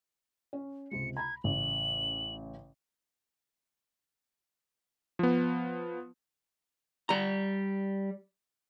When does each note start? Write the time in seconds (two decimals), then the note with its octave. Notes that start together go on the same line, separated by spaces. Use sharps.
0.53 C#4
0.91 C#2 C3 G#3 C#7
1.17 A#5 B5 G#6
1.44 A1 C#3 F#7
5.19 F3 B3
7.09 G3 A#5